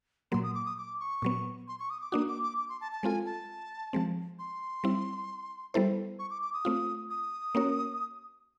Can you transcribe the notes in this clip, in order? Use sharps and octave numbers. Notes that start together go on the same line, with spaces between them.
A#2 F#3 A#3 C6
D#6
D6
D#6
D6
C#6
A#2 F#3 B3
C6
C#6
D#6
D6
A#3 D4 F#4 D#6
D6
D6
D6
C6
A5
A5
G#3 C4 F4 A4 G#5
A5
F3 G#3 C4
C6
G3 C4 E4
G3 B3 E4 A4 C5
C#6
D6
D6
D#6
A3 C4 F4
D#6
A#3 C#4 F#4 A#4 C#5